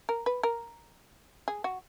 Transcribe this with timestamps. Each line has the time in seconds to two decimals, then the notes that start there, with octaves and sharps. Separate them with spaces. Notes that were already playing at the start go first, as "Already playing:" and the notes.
0.09 A#4
0.26 B4
0.43 A#4
1.48 G#4
1.64 F#4